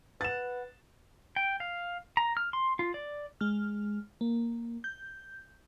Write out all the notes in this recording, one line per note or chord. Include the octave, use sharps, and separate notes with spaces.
B4 F#5 A6 E7
G5
F5
A#5
F6
C6
F4
D5
G#3 F6
A#3
G6